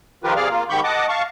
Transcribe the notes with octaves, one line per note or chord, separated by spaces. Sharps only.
D#3 F3 F4 G4 A#4 B4
C3 G#4 D5 F5 F6
A#3 F4
G#2 D#3 G4 B5 C#6 G6
D#5 F#5 A5 D6
F5 A5 C#6